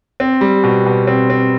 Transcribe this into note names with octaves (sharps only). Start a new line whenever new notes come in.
C4
G3
B2
B2
C4
C4